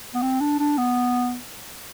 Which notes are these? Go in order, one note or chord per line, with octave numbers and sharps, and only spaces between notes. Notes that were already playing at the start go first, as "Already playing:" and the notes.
B3
C4
D4
D4
B3